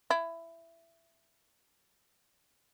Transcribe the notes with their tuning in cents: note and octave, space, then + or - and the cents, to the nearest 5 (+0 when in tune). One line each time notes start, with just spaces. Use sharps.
E4 +15